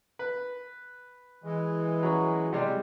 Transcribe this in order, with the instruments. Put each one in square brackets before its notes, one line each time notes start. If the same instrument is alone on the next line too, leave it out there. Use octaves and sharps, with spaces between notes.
[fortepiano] B4
[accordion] E3 G#3
[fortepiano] F#3 C#4
C3 G3 G#3